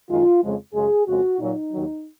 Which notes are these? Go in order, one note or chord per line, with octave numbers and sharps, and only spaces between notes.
F#2 D#3 G#3 F4
F2 C#3 F3 G#3
F#2 C#3 G#3 G#4
F2 C#3 G#3 F#4
A#2 F#3 D#4
D#2 D#3 F#3